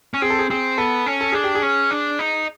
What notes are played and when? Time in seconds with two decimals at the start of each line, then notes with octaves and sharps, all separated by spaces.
0.14 C#4
0.22 C4 G#4
0.30 A4
0.39 G#4
0.50 C4 G#4
0.78 B3 A4
1.06 C#4
1.21 A4
1.33 D4 G#4
1.44 G4
1.55 G#4
1.63 C#4
1.91 D4
2.19 D#4